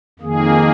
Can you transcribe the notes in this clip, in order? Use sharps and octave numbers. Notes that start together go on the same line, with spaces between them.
F2 D#3 A#3 G#4